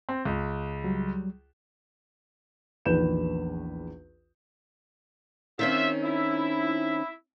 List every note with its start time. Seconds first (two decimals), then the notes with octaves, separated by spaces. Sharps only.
0.09 C4
0.25 C#2
0.84 F#3 G3
2.86 A#1 E2 D#3 B4 G6 E7
5.59 D#3 C4 C#4 F4 E5
6.03 E4 E5